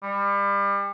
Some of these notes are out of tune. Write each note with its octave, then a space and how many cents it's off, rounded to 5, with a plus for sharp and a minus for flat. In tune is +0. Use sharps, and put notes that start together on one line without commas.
G3 +35